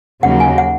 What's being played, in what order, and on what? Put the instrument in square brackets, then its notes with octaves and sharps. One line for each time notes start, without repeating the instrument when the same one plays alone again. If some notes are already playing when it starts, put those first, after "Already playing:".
[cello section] D#2 C#3 F#3 A#3 [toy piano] F#5
[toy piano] G#5
F#5